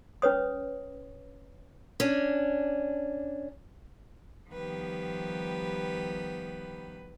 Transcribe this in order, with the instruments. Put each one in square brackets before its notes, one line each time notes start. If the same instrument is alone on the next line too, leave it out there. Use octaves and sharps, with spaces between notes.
[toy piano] C#4 B4 C#5 D#6
[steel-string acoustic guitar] C#4 D4
[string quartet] D#3 F3 G3 B3 G4 B4